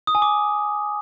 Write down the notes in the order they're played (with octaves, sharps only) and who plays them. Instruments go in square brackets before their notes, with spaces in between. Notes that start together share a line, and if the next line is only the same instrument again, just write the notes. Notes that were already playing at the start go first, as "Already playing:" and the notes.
[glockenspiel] D#6
G#5
D6